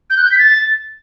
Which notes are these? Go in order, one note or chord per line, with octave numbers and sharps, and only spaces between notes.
G6
F#6
G6
B6
A6